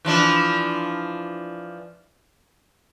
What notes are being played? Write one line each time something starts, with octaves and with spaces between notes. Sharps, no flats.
E3 F3 D4